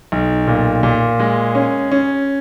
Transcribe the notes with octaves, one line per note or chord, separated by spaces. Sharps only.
B1
A#2
A#2
G#3
C#4
C#4